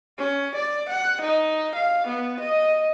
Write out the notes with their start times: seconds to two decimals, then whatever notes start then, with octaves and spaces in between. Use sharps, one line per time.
0.18 C#4
0.56 D5
0.89 F#5
1.22 D#4
1.76 F5
2.08 B3
2.40 D#5